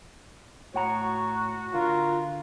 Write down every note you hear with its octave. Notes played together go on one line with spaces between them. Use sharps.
A2 F#4 C#5 F#5 A#5
D3 F4 A#4